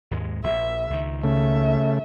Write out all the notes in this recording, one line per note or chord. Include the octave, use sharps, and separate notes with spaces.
D#2 G#2 G#3
A#1 E5
C#2 D#3
C#3 A3 E5